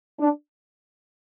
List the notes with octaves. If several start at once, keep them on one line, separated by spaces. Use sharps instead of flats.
D4